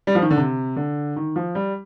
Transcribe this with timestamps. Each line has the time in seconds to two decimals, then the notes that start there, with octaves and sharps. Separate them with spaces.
0.07 G3
0.15 F3
0.22 D#3
0.31 D3
0.37 C3
0.76 D3
1.16 D#3
1.36 F3
1.55 G3